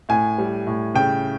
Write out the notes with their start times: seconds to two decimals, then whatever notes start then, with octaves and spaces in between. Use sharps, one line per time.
0.09 A2 G#5
0.38 G3
0.67 A2
0.95 C#3 G5